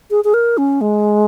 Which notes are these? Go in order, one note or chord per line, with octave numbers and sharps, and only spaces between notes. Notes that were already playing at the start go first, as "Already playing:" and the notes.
G#4
G#4
A#4
C#4
G#3